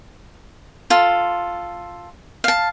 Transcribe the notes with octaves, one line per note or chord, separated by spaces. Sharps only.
F4 A4
F5 A5